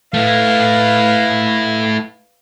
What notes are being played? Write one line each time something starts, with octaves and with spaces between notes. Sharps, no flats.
A3 E4 B4 F5